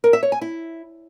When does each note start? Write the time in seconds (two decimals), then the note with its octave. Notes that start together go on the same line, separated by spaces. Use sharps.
0.04 A#4
0.13 E5
0.23 C#5
0.32 G#5
0.41 E4